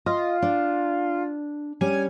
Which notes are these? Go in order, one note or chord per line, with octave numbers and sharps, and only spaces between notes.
F4 D#5
D4
G3 C#4 G#5